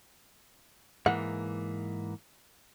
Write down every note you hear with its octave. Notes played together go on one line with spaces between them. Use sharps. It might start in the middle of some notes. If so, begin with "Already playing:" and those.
G#2 E3 A#3 F#5